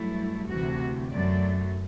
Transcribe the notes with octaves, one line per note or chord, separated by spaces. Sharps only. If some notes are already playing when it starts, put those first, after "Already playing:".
Already playing: G2 F#3 A3 E4
D2 C3 E3 A3 F#4
F#2 F#3 A3 D5